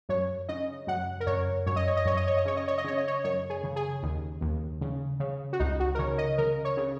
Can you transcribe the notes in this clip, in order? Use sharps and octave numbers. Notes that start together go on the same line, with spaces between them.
F#2 C#5
C#3 D#5
F#2 F#5
A#4
F#2 C#5
F#2 C#5
D#5
C#5
D#5
F#2 C#5
D#5
C#5
D#5
C#3 C#5
D#5
C#5
D#5
C#3 C#5
D#5
C#5
F#2 C#5
G#4
C#3
G#4
D#2
D#2
C#3
C#3
F#4
C#2 D#4
F#4
A#4
C#3 C#5
D#5
C#3 A#4
C#5
C#3